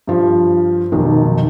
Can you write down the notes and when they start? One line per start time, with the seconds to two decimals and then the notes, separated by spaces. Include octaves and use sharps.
0.07 G2 F3
0.92 F1 B1 B2 D#3